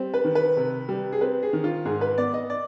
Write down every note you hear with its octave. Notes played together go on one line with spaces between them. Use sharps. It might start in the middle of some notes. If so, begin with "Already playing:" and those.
Already playing: G3 C4
B4
D#3
B4
C3
G3
G#4
C4 B4
G#4
D#3
F4
G#2 G#4
B4
B3 D5
D#5
D5